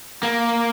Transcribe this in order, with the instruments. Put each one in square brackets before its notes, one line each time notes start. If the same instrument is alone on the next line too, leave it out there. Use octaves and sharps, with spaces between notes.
[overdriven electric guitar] A#3